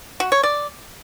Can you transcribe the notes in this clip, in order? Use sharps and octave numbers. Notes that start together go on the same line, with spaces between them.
F#4
C#5
D5